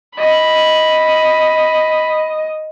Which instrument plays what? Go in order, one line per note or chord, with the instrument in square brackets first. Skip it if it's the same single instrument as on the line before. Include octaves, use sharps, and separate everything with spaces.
[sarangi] D#5 [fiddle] B5